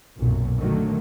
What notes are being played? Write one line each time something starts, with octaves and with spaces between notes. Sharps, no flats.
B1 F#2 A#2
D3 D#3 F#3 A3